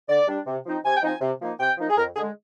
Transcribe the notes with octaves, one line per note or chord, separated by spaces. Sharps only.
D3 D5
G3 D4
C3
F3 C4 D#4
C3 G#5
G5
F3 C4 D#4 G#5
C3
F3 A#3 D#4
C3 G5
F3 A#3 D#4
G#4
F2 A#4
D3 G#3 G#4